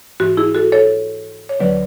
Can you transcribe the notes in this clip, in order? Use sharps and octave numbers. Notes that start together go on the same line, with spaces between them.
G#2 E3 F#4
E4 G#4
F#4 A4
A4 C#5
C#5
D2 D3 F#3 B4 D5